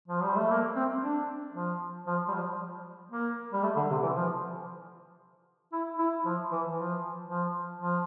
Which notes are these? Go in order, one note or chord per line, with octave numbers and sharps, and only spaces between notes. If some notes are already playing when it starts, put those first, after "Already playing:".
F3
G3
A3
A#3
C4
D4
F3
F3
G3
F3
A#3
G3
A3
D3
C3
E3
F3
E4
E4
F3
E3
F3
F3
F3